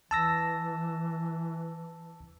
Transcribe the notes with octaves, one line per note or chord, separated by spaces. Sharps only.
E3 A5 E6 A#6